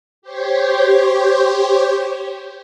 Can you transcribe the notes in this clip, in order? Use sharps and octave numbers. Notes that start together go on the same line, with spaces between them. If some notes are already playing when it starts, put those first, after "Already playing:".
G4 C5 C#5